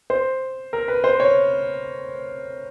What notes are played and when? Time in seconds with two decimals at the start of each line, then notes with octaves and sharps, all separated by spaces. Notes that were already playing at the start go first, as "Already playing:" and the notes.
0.10 C5
0.73 A#4
0.88 B4
1.04 C5
1.20 C#5